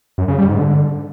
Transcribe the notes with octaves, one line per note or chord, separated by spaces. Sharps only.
F#2
C#3
G3
G#2
D3